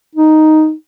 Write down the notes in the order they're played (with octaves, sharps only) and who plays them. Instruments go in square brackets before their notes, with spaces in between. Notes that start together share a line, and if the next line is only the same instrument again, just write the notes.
[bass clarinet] D#4